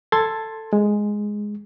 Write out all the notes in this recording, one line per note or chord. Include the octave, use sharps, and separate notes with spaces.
A4 C6 G#6 A6
G#3